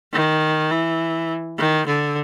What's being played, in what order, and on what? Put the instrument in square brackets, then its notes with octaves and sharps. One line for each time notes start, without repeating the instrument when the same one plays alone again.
[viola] D#3
E3
D#3
D3